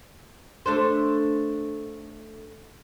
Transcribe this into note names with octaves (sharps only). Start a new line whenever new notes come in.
A3 D4 C5